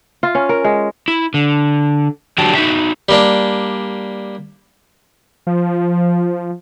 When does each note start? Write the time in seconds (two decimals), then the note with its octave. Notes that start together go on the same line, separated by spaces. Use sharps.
0.23 F4
0.35 C#4
0.49 A#4
0.64 G#3
1.08 E4
1.34 D3
2.38 D3 F#3 D4 G4 G5 A5
2.55 D#4 F#4 E5
3.09 G3 A#3 D4
5.47 F3